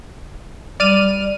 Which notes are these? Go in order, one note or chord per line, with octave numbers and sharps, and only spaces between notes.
G3 D5 F6 D#7